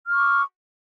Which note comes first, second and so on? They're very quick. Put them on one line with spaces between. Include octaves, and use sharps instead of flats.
F6 C#6 D6 E6